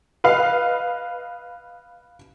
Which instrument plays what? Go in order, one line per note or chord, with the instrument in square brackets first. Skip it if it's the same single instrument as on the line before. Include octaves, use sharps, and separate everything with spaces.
[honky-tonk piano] B4 D#5 F5